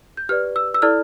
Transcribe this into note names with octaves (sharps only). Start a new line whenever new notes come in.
G6
G4 B4 D5 F6
E6
E6
E4 A4 D5 F6